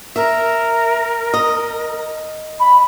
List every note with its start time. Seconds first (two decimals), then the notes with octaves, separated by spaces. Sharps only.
0.16 A#4 E5
1.34 D#5
2.60 B5